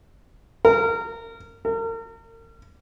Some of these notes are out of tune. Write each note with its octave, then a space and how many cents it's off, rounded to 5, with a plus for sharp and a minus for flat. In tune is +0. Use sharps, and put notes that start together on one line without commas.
A#4 -25
A#4 -40